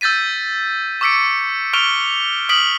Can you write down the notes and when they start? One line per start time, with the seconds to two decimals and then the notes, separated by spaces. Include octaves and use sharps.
0.01 E6 G6 A6 B6 D#7
1.01 C#6 D6 E6 B6 C#7 D7
1.73 C#6 F6 D7 F7 G7
2.49 D#6 F6 B6 D7 F#7